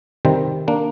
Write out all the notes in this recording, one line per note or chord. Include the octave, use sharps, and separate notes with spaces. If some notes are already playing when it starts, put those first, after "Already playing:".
C3 D#3 G3 C4
A#3 D4